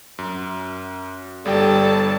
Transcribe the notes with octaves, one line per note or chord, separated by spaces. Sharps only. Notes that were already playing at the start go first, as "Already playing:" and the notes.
F#2
G1 G3 A4 D5 G5 A5